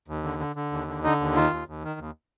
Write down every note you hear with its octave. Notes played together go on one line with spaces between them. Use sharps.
D#2
D3
D3
D3
D#2
D3
D3 D#4
D#2
D#3 F4
D#2
D#2
D#3
D#2